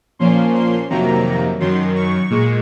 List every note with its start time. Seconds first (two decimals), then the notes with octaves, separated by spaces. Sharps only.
0.19 A#2 F3 A#3 C#4 C6
0.55 C6
0.90 F2 C3 D#3 F#3 A#3 A#5
1.60 F#2 D#3 F#3 C6
1.95 C#6
2.30 A#2 G#3